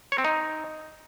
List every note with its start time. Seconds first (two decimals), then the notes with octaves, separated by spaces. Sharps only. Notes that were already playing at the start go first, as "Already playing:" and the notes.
0.12 C#5
0.18 C4
0.25 D#4